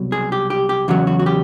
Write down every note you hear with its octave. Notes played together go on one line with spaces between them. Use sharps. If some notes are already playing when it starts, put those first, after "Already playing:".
Already playing: C2 B2 F#3
G#4
G4
G4
G4
E2 C#3 F#3 F#4
F#4
F#4
G4